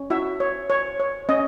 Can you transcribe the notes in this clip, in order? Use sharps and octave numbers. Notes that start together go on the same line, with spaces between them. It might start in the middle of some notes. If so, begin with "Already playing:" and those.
Already playing: C#4
E4 F#4 E5
C#5
C#5
C#5
C#4 D#5